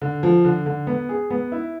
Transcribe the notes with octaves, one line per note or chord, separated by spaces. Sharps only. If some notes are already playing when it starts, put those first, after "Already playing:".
D3
F3
D3
D3
B3
G#4
B3
E4